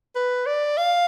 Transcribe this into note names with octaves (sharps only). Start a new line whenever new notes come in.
B4
D5
F5